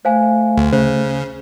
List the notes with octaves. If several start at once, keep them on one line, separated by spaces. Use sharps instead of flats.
A3 C5 F5 G#5
D2
C#3 C5